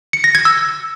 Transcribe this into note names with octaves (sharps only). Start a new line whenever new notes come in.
C#7
A#6
G#6
E6